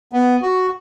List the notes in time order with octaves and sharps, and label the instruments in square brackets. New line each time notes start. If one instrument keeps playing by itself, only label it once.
[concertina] B3
F#4